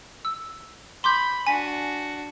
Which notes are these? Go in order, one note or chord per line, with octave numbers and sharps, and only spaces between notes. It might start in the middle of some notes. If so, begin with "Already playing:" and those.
E6
B5 C6 D6 G6
D4 F#4 G#5 B6